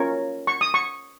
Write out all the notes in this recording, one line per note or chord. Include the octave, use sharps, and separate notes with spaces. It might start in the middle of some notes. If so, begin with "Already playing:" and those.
Already playing: C#4 F4 A#4 C#5
C#6
D#6
C#6